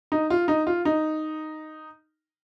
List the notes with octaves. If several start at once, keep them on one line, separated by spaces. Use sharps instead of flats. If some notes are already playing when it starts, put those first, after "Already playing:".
D#4
F4
D#4
F4
D#4